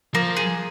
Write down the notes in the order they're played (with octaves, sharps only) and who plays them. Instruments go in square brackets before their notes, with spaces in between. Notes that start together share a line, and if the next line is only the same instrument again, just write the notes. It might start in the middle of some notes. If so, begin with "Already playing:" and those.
[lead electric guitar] F3 [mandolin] A#3
[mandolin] G#4